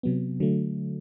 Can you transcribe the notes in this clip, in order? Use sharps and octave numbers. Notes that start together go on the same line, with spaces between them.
C3 F#3 B3
D3 F#3 A3